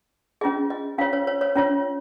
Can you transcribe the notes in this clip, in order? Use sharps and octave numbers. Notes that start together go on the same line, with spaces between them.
C#4 F4 G#4 D#5
D#5
C#4 F4 C#5 F5
C#5
C#5
C#5
C#4 F4 C#5